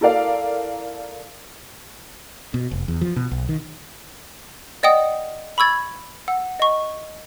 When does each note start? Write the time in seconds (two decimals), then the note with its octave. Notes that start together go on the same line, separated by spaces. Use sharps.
0.01 E4 A4 A#4 D5 F5
2.54 B2
2.71 F1
2.88 E2
3.01 F3
3.16 B2
3.31 B1
3.49 D#3
4.83 D5 D#5 F#5 G5 D#6
5.58 B5 C#6 E6 G#6 A6
6.28 F#5 E6
6.60 D#5 C#6